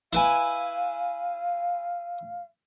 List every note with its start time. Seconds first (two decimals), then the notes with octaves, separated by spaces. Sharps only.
0.13 E4 B4 F5 G#5